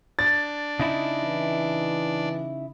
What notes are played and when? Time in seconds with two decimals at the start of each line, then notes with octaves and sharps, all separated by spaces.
0.19 D4 A6
0.80 C#3 D#4 E4
1.23 E3